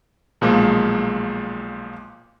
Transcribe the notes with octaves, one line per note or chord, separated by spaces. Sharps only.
B1 A#2 F3 G#3 A#3